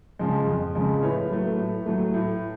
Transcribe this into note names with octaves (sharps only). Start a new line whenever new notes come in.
C#3 F3 G#3
F2
C#3 F3 G#3
A2 B4 C#5
F#3 A3
A2
F#3 A3
A2